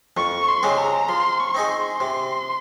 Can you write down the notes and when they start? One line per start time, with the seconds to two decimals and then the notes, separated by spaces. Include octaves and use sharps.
0.17 F2 C#6
0.48 C6
0.63 C#3 G#3 C4 G4
0.77 A#5
1.09 F3 C6
1.40 C#6
1.55 C4 D#4 G#4
1.70 C6
2.00 C3